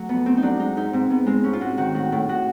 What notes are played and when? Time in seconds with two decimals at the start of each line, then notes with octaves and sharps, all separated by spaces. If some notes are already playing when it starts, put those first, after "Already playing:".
Already playing: F#3 A3
0.09 F2 B3
0.26 A3 C4
0.37 D#4
0.43 F#3 D4
0.59 G#3 D#4
0.77 G#2 D#4
0.93 G#2 C4
1.10 G#2 B3
1.26 G#3 C4
1.43 G#2 C#4
1.53 F4
1.61 G#2 F#4
1.77 D#3 F#4
1.94 A2 F#4
2.12 A2
2.28 A2 F#4